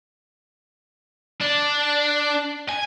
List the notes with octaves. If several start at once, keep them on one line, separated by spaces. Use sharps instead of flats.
D4
G#5